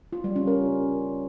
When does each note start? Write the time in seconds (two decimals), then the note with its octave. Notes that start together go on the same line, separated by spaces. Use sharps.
0.13 F4
0.24 G3
0.36 C#4
0.47 A#4